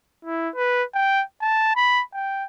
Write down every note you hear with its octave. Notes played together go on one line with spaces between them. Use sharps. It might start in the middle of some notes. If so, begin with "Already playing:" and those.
E4
B4
G5
A5
B5
G5